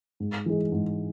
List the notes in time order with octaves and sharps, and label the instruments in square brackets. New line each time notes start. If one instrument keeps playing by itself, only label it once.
[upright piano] G#2
E3 G#3
G#2